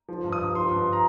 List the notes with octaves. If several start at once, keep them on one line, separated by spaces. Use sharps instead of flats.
F3
G2
D#6
G2
F3 C6
G2
A#5